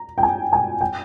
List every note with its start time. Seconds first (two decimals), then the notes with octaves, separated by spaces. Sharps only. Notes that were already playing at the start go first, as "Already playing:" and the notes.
Already playing: A#5
0.18 G5
0.23 G#5
0.53 G#5
0.81 G5